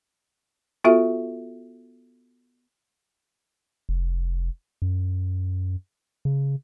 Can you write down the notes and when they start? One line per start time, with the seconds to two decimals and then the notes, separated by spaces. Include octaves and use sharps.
0.84 B3 F4 F#4 A4 E5
3.89 F1
4.82 F#2
6.25 C#3